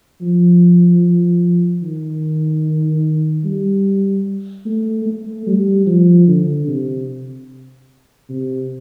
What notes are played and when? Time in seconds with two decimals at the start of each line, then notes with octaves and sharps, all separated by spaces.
0.21 F3
1.82 D#3
3.44 G3
4.66 A3
5.06 A3
5.46 G3
5.87 F3
6.28 D3
6.67 C3
8.29 C3